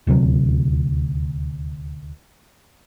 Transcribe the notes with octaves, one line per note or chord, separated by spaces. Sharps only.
D#1 D2 C3 F#3